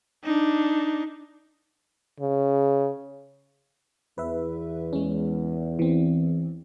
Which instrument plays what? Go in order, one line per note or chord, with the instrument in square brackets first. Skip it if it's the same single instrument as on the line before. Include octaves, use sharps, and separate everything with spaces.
[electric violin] D4 D#4
[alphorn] C#3
[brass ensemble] E2 [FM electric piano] B4 E5
[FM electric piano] G#3 C#4
E3 C4